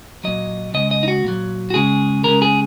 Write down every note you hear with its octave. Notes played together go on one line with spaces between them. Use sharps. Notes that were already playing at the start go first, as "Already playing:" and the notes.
A#2 F#3 D#5
C#3 G#3 D#5
D#5
D#4
F#4
A#2 F#3
F#4
C#3 G#3 G#4
C#3 G#3 A#4
G#4